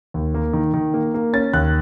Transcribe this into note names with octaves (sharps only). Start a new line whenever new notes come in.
D#2
A#3
D#3
D#3
A#3
A#3
C#4 A6
D#2 F#6